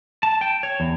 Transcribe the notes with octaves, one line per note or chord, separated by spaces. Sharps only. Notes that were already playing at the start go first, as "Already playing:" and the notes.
A5
G5
C#5
E2